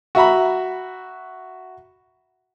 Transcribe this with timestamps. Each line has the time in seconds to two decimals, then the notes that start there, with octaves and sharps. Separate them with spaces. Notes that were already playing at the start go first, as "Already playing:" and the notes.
0.15 F#4 E5 A#5 B5